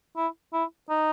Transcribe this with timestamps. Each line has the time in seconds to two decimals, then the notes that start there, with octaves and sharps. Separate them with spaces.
0.17 E4
0.53 E4
0.90 D#4